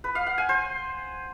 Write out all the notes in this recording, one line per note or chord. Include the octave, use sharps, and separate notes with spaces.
B4
F5
F#5
G#5
C5